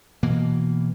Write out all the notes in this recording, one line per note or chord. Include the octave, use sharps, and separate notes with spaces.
B2 E3 A#3